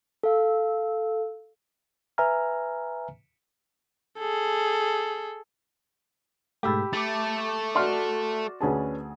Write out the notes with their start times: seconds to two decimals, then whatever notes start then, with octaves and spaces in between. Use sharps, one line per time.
0.23 A4 F5
2.18 B4 E5 G#5 A#5 F6
4.18 G#4 A4
6.63 G#2 B2 A3 G4 B5 E6
6.93 A3 D6 A6
7.75 F#4 D5 E5 C6 F6
8.61 D2 C#4 G#4 B4 A5